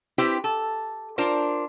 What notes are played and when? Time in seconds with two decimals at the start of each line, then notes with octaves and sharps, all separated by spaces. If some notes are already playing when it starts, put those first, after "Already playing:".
0.18 C4 E4 G4 B4 C5
0.44 A4
1.18 D4 F4 A#4 C5